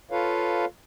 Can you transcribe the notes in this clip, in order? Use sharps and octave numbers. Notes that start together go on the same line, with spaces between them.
F4 A4 B4 C#5 F5